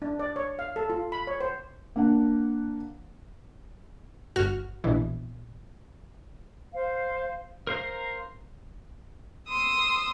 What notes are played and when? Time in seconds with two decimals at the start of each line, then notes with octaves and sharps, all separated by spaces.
0.02 D4
0.19 D5
0.36 C#5
0.59 F5
0.76 A4
0.90 F4
1.12 B5
1.27 C#5
1.41 C5
1.96 A#3 D4 F#5
4.36 G1 F#4 F6
4.84 A#1 B2 E3
6.73 C5 F5
7.67 A#4 C5 F5 A#5
9.48 C6 D#6 E6